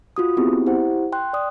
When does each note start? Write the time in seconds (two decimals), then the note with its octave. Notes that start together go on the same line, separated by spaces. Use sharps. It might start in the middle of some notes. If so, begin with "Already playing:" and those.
0.16 F4 F#4 D#6
0.37 B3 C4 E4 G4 G#4
0.67 E4 G4 C5 F#5
1.12 G5 C6 F#6
1.33 D5 D#6